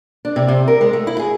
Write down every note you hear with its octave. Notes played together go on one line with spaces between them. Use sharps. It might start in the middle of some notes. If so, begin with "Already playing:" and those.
D4
C3
C3
A#4
G#3
A3
E4
G#4